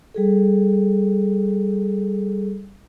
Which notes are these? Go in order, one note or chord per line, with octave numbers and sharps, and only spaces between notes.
G3 G#4 A4